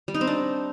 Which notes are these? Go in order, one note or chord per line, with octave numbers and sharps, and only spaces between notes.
G3
D#4
C4
D4